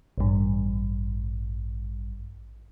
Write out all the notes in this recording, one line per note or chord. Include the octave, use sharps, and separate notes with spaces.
A1 G2